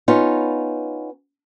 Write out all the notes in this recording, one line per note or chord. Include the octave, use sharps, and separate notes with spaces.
B3 C#4 D#4 F4